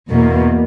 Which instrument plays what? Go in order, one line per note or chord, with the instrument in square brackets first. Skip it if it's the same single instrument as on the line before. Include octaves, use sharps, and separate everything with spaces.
[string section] E2 B2 A#3